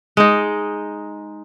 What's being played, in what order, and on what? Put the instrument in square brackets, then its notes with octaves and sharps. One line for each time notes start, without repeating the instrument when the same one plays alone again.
[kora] G#3 D#4